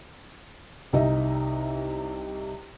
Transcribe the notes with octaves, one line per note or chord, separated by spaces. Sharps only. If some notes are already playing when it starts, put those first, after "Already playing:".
C2 C3 D#4 D#5 E5